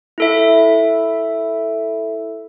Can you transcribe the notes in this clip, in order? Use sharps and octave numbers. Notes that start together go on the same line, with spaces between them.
E4 A4 E5